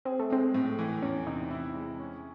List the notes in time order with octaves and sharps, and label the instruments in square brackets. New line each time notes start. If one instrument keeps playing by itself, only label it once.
[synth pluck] C4 [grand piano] G#4
[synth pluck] A3
[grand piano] G#3 [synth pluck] C4
[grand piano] A2
E3
[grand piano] E2 [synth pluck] C#4
[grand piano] C3 [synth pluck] D#4
[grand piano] E4
G#3
C#4